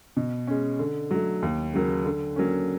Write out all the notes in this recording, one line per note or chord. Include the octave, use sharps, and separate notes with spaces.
B2
G#3 C#4
D3
F#3 A3
D#2
C#3 F#3 A#3
D3
F#3 A#3 C#4